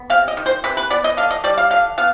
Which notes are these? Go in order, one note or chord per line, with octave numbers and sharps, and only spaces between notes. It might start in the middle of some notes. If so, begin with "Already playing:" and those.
Already playing: B3
C3 F5
D#5
D#3
C5
C3 B4
B4
B3 D5
D#5
D3 F5
D#5
G3 D5
F5
D3 F5
B3 F5